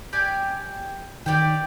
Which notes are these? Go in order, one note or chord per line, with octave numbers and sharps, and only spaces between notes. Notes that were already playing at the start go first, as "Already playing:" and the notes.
G4 D5 G#5
D#3 G4 D5 G5